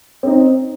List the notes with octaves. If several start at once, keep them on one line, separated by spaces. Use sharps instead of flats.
C4 D#4